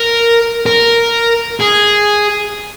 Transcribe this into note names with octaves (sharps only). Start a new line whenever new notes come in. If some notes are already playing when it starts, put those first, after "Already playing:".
Already playing: A#4
A#4
G#4